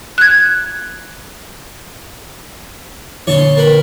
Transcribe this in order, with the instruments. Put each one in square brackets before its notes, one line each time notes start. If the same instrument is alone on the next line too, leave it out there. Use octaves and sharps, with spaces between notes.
[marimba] F#6 G#6
[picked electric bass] A#2 D3 E3 [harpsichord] C#5 A5 C6
[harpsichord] A#4 B4